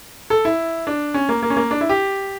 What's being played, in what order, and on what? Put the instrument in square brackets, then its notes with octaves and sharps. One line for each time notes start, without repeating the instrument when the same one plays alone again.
[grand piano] A4
E4
D4
C#4
A#3
A#3
C#4
A#3
D4
E4
G4